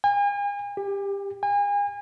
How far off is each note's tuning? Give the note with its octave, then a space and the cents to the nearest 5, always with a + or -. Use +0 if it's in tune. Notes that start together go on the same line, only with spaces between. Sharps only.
G#5 -40
G4 +20
G#5 -35